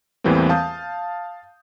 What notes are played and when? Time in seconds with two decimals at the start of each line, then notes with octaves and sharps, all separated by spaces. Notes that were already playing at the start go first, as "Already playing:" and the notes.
0.24 E2 A2 E3 G3 A#3 C4
0.49 F5 A5 D#6 G6